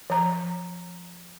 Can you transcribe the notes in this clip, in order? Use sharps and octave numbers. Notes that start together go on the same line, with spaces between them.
F3 A#5